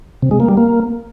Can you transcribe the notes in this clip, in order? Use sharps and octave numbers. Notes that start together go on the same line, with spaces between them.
C3
G#3
A#3
G3
A#3